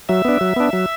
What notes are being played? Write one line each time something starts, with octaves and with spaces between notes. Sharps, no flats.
F#3 E5
B3 D4
F#3
B3 D4
F#3